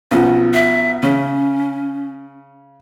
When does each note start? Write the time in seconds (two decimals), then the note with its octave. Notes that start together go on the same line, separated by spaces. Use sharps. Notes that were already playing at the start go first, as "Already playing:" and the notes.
0.11 B1 F3 B3 C#4
0.54 E5
1.03 C#3 C#4